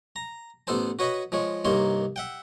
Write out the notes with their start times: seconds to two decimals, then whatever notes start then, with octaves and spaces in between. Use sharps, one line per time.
0.16 A#5
0.67 A1 B3 A4 C5 A5
0.99 F#4 B4 C#5 D#5 B5
1.32 F3 G#3 C#5
1.65 C2 G2 D#3 A#3 C#5 C6
2.16 E5 F#5 G5